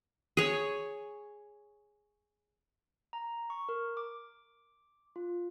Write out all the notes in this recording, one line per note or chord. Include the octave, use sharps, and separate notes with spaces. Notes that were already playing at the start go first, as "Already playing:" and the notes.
G#4 C#5
A#5
C#6
A#4
D6
F4